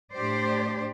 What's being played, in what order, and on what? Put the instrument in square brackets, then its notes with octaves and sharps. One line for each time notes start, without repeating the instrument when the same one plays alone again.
[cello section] A2 D4 G4 C5 D5